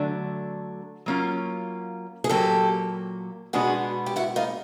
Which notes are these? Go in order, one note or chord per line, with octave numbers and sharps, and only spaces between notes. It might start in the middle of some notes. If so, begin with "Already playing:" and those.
Already playing: D3 F#3 A3 D4
F#3 A#3 C#4 F4
G#4
A#2 F#3 A#3 G4 A4
B2 G#3 B3 D4 F#4 G#4
G4
E4 F#4
D#4 F4